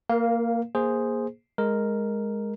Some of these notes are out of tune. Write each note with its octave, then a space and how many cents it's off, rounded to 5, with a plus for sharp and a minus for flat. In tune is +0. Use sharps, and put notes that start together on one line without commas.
A#3 -15 A#4 +30 F5 +0
A#3 +5 G#4 +0 C5 +0
G#3 +0 A#4 +0